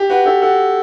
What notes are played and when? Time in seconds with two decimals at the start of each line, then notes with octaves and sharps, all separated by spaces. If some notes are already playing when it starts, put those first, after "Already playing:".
Already playing: G4
0.10 F#4 B4
0.26 G4 A4
0.42 F#4 A4